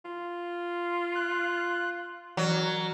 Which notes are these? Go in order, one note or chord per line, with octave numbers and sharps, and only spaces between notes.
F4
F#6
E3 F#3 A#4